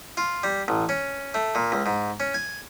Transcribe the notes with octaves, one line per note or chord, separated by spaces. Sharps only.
F4
G3
A1
C#4
A3
A#2
C#2
G#2
C#4
G#5